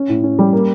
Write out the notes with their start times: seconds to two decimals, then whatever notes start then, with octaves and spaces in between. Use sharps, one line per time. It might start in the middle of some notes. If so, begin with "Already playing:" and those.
Already playing: C#4
0.09 A2
0.23 C#4
0.39 G3
0.53 A#3